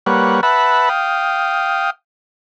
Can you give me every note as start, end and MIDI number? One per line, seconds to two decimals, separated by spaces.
0.06 0.41 55
0.06 0.41 58
0.06 0.41 71
0.06 0.41 73
0.06 0.41 78
0.43 0.89 71
0.43 0.89 76
0.43 0.89 78
0.43 0.89 81
0.43 0.89 83
0.89 1.90 77
0.89 1.90 79
0.89 1.90 87